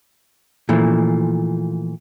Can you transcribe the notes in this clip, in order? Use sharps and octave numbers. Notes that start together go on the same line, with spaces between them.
A#2 E3 F3 A3